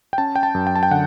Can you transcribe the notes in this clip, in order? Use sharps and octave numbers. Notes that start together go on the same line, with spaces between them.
G5
C#4 A5
G5
A5
F#2
G5
A5
G5
D3 F#5